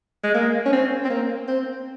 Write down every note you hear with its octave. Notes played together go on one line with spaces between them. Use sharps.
G#3
A#3
C#4
C4
C4
A#3
C4